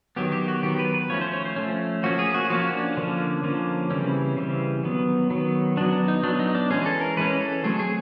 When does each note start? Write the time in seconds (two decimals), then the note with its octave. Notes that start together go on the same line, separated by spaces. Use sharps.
0.16 D#3 F#3 B3 G4
0.32 G4
0.48 F#4
0.63 D#3 F#3 B3 G4
0.79 B4
0.94 B4
1.10 F3 A3 C#4 C#5
1.21 C5
1.33 C#5
1.45 C5
1.56 F3 A3 C#4
2.03 F3 A#3 C#4 F#4
2.19 G#4
2.34 F#4
2.50 F3 A#3 C#4 F#4
2.73 D4
2.97 D3 F3 A#3 C#4
3.44 D3 F3 A#3 C#4
3.90 C#3 E3 G3 C4 C#4
4.37 C#3 E3 G3 C4
4.83 D#3 F#3 B3
5.30 D#3 F#3 B3
5.77 F#3 B3 D4
5.93 D4
6.08 D#4
6.23 F#3 B3 D4
6.39 D#4
6.55 D4
6.70 E3 G#3 C#4 G#4
6.86 A4
7.01 A#4
7.17 E3 G#3 C#4 B4
7.40 A4
7.64 F#3 A3 C4 G#4
7.79 G#4